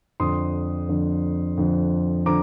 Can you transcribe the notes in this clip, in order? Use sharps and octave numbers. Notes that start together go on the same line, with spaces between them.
F2 D3 F3 C6 D#6
F2 D3 F3
F2 D3 F3
D3 F3 A#5 D6